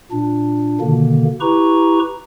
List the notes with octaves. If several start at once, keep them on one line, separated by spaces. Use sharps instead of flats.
A#2 D4
B2 D3 D#3 A#3
E4 G4 B4 A#5 C#6